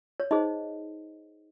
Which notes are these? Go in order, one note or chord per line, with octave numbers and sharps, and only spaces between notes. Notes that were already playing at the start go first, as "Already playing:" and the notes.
C#5
D#4 G#4 C5 D#5